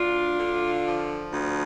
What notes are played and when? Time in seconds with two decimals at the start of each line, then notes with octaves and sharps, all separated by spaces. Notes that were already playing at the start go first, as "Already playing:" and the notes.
Already playing: D2 D4 F4
0.38 D3
0.85 F3
1.32 D2